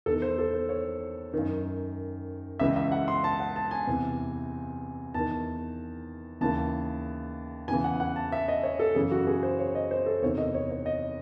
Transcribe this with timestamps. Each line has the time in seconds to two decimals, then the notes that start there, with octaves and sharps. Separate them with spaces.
0.06 E2 D#3 A4
0.22 C5
0.38 A4
0.53 C5
0.69 C#5
1.34 F#2 D#3
2.59 C#2 C#3 E3 E5
2.76 E5
2.92 F#5
3.08 C6
3.24 A5
3.40 F#5
3.56 A5
3.71 G#5
3.87 E2 C3 E3
5.14 E2 D#3 A5
6.41 D#2 C#3 E3 A5
7.68 E2 C#3 E3 G#5
7.84 F#5
8.00 F#5
8.16 A5
8.32 E5
8.48 D#5
8.63 C#5
8.79 A4
8.95 F#2 C#3 E3 G#4
9.11 F#4
9.27 G#4
9.43 C5
9.59 C#5
9.75 D#5
9.91 C5
10.06 A4
10.22 E2 C3 D#3 C#5
10.38 D#5
10.54 C#5
10.70 C#5
10.86 D#5